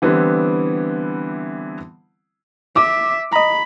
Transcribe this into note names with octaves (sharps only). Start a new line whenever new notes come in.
D3 E3 G3 B3 C4 E4
E5 D6
D#5 A#5 B5